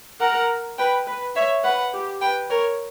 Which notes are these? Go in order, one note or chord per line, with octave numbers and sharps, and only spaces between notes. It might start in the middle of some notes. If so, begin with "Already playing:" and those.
A#4 F#5
B4 G5
B4
C#5 E5
B4 F#5
G4
B4 G5
A#4 C#5